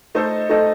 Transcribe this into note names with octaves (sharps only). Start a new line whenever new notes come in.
A3 D#4 A4 C5 D#5
A3 D#4 A4 C5 D#5